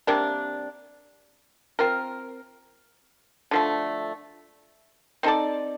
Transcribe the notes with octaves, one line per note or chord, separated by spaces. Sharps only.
C3 G3 A#3 D4
C4 F4 A#4
D3 F3 A3
C4 D#4 A4 D5